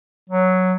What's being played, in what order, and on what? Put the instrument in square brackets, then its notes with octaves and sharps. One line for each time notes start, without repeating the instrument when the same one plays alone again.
[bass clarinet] F#3